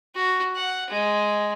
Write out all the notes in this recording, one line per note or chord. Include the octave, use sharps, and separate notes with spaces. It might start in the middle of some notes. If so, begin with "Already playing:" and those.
F#4
F#5
G#3